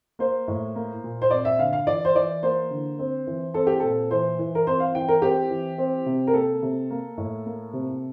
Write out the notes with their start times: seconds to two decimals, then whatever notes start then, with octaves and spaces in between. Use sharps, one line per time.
0.19 A#3 C5
0.48 A2
0.75 A#3
1.04 A#2
1.22 C5
1.31 C4 D5
1.45 E5
1.59 D3 F5
1.73 F5
1.87 E3 D5
2.05 C5
2.15 E3 D5
2.43 A#3 C5
2.71 D3
2.99 C4
3.27 E3
3.54 C4 A4
3.67 G4
3.80 A#2 A4
4.11 E3 C5
4.39 E3
4.55 A#4
4.67 C4 C5
4.80 F5
4.95 E3 G5
5.08 A#4
5.22 C4 G4
5.50 E3
5.78 C4
6.06 C3
6.27 A#4
6.34 A#3 A4
6.63 C3
6.90 A#3
7.17 A2
7.46 A#3
7.73 C3